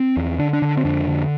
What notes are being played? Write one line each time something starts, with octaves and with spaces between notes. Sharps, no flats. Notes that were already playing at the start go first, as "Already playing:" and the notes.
Already playing: C4
E2
D3 D4
D4
D3
C4
F2 D4
D3